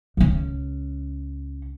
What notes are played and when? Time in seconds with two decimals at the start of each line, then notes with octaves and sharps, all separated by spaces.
0.17 C#2 C#4